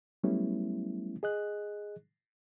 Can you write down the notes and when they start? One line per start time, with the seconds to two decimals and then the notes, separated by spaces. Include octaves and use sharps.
0.23 F#3 G3 A3 B3 C#4 E4
1.23 G#4 D#5 F#6